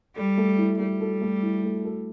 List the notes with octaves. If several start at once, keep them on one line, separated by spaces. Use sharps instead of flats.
G3 A4
A3
E4
G3 A3
A4
A3
E4
A3
A4